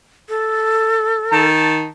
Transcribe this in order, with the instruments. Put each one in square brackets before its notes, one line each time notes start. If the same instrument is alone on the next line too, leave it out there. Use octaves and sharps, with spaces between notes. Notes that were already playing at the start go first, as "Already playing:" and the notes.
[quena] A4
[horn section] D#3 A5